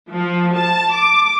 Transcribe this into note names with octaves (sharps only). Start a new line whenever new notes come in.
F3
A5
D6